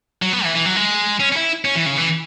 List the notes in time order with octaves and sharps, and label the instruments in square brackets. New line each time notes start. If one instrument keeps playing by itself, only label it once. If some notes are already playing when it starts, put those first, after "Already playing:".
[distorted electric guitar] F#3
B3
E3
E3
F#3
G#3
C#4
C#4
E4
C#4
E3
C#3
E3